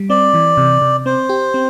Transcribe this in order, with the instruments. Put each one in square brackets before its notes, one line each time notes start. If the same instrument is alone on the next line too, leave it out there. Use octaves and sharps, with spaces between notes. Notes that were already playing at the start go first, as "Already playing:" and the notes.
Already playing: [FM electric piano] G3
[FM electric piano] C4 [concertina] D5
[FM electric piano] E3
C3
C3
[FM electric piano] C4 [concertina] C5
[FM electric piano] G4
C4